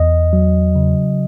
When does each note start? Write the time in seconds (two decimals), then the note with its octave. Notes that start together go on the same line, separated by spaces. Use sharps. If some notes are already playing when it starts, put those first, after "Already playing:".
Already playing: E2 D#5
0.33 F#3
0.75 C#3